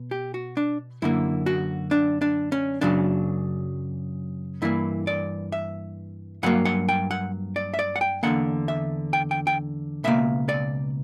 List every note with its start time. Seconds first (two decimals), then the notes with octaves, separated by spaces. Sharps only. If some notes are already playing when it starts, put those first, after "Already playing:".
Already playing: B2
0.11 G4
0.34 F#4
0.57 D4
1.02 F#2 D3 A#3 E4
1.46 F#4
1.91 D4
2.22 D4
2.52 C#4
2.81 F#2 C#3 F#3 D4
4.62 G2 E3 A#3 E4
5.07 D5
5.52 E5
6.43 G2 F#3 A#3 F#5
6.65 F#5
6.89 G5
7.11 F#5
7.56 D5
7.74 E5
7.79 D5
7.96 F#5
8.01 G5
8.23 E2 D3 A#3 F#5
8.68 E5
9.13 G5
9.31 G5
9.47 G5
10.04 C#2 B2 A#3 E5
10.49 D5